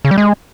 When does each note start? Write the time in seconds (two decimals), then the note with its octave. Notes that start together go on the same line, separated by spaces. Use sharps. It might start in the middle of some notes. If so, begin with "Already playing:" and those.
0.05 C#3
0.11 G3
0.18 G#3